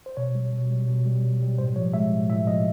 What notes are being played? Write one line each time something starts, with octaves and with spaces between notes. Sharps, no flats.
C5
B2 C#5
G3
B2
G3
B2
G3
B2
G3
A2 C5
F3 C#5
G#3 E5
A2
A2 E5
F3 D#5